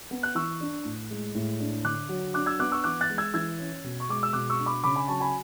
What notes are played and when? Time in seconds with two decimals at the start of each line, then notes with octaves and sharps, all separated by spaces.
0.11 B3
0.23 F#6
0.35 E3 C#6 E6
0.61 D4
0.85 A2
1.10 G#3
1.35 A2
1.60 D4
1.84 D3 D6 F#6
2.09 F#3
2.34 D4 D6 F#6
2.46 E6 G#6
2.59 B3 D6 F#6
2.72 C#6 E6
2.84 E3 D6 F#6
3.01 F#6 A6
3.10 G#3
3.18 E6 G#6
3.34 E3 E6 G#6
3.58 C#4
3.84 B2
4.00 C#6
4.09 G#3 D6
4.23 E6
4.33 B2 D6 F#6
4.50 C#6 E6
4.58 D4
4.66 B5 D6
4.84 C#3 B5 D6
4.95 G#5 B5
5.08 F#3 A5 C#6
5.20 G#5 B5